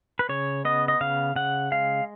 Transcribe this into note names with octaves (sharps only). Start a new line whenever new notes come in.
B4
C#3 C#5
B3 D#5
D#5
C#3 F5
C#3 F#5
G#3 F5